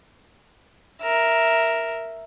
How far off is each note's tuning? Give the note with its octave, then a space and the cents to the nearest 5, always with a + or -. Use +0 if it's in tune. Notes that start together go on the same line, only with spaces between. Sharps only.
A#4 +0 E5 +0